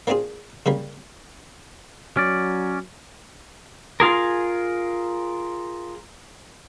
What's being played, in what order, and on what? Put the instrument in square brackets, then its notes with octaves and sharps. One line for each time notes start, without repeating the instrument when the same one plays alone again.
[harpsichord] A#3 C4 D4 F4 G#4
C#3 G3 A#3
[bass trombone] F#3 [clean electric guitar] C#4 D5
[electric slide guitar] F4 G#4 A#4